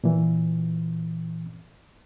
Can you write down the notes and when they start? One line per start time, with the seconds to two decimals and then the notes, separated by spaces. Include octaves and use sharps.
0.04 A#2 E3